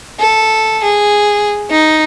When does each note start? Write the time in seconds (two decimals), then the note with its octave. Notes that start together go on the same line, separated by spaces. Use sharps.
0.20 A4
0.83 G#4
1.70 D#4